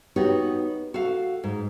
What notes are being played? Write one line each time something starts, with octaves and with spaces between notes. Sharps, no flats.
B3 D#4 F#4 G4 C#5
F#4 A4 F5
G#2